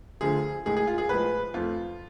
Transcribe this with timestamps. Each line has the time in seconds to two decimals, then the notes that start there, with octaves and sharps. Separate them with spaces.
0.21 D2 D3 F3 G#4
0.66 A2 G#3 G#4
0.77 G#4
0.87 F4
0.98 G#4
1.09 A2 F3 G#3 B4
1.54 F2 F3 A3 F4